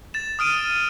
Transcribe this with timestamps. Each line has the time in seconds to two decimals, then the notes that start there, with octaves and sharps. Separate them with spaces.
0.14 A6 E7
0.39 D#6 F6 D7 D#7